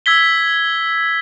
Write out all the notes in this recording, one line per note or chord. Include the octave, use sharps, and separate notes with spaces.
E6 G#6 B6 G7